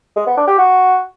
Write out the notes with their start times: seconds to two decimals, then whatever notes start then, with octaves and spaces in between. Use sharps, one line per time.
0.16 G#3
0.26 B3
0.37 D4
0.47 G4
0.58 F#4